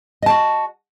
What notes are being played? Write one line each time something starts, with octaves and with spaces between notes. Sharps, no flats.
F#4 D#5 A5